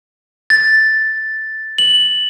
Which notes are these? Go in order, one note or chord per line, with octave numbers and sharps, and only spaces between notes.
A6
F#7